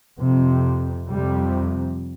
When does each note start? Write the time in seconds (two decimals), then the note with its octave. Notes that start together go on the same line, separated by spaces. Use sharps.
0.18 F2 C3
1.09 F2 C3 G3